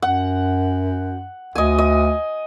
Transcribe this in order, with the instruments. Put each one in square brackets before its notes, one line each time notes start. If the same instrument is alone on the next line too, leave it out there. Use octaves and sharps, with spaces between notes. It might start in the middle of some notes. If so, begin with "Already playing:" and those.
[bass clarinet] F#2 [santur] F#5
[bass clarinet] D2 [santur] D#5 G#5
[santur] D#5